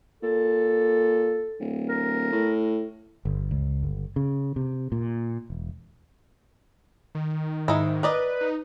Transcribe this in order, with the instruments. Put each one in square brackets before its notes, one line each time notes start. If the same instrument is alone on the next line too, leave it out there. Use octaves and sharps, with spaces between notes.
[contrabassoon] A#2 [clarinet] A4
[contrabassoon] D1
[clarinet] A#4
[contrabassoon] A2
[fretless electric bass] G1
C#2
G1
C#3
C3
A#2
E1
[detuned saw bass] D#3
[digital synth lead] G#2 [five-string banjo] D#4 E4
[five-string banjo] A#4 D5 D#5 [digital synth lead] B4
[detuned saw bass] D#4